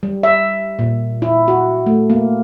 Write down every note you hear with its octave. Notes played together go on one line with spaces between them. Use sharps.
G3
E5
A#2
E4
F#4
A3
A#3